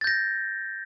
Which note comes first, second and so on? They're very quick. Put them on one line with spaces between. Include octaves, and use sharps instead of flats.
A6 G6 A#6